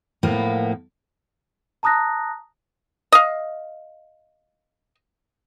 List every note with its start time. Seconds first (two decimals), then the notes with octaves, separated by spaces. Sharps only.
0.23 A2 F3 A#3 B3
1.83 A5 A#5 D#6 F#6 A#6
3.12 D#5 F5